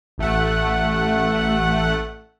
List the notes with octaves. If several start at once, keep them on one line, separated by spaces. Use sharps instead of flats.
A1 A3 F#5